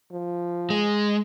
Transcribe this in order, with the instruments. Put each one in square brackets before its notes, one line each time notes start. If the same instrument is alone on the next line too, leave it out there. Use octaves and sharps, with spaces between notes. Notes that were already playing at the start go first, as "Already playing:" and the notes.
[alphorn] F3
[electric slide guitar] G#3